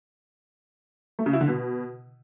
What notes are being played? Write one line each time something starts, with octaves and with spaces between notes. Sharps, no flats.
A3
C#3
E4
D3
B2